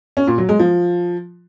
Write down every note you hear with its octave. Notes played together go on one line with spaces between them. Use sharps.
C#4
A#2
F#3
G#3
F3